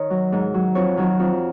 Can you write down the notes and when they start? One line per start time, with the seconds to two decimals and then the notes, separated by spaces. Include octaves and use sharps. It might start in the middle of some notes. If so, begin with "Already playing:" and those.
Already playing: D#3 C#5 D#5
0.10 F#3
0.32 G#2
0.54 F#3
0.75 F2 C#5
0.97 D#3 F#3
1.19 F2